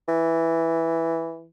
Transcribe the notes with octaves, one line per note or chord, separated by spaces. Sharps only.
E3